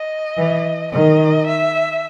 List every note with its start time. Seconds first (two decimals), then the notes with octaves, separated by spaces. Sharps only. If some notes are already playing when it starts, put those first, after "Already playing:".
Already playing: D#5
0.37 E3
0.92 D#3 D#5
1.47 E5